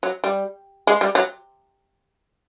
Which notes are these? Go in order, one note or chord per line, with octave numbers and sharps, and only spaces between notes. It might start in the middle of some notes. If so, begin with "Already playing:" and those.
F#3
G3
G#3
G3
F#3